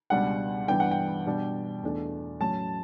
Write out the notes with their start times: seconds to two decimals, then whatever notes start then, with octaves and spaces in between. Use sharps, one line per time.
0.10 C#2 B2 G3 D4 F#5
0.68 G2 E3 B3 D4 G5
0.80 F#5
0.91 G5
1.26 B2 G3 D4
1.83 E2 B2 A3 D4
2.40 A2 F#3 C#4 A5